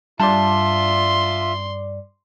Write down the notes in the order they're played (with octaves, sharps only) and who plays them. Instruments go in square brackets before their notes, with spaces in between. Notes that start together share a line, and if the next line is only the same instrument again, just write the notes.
[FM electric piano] G2 D5 [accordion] F4 E5 [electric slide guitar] A5 [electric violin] C6